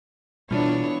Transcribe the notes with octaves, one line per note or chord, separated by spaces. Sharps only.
B2 E3 G3 B3 D4 E4 F4 C#5